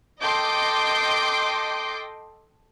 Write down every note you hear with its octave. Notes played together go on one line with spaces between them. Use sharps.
A4 D#5 G5 C6 D6 G6